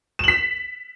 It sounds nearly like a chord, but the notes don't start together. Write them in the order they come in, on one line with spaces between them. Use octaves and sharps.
E7 F#7 B6